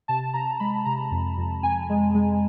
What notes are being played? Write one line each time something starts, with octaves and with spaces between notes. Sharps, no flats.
C3 A5
C3 A#5
G#3 B5
C3 A#5
F2
F2
F2 G#5
G#3
G#3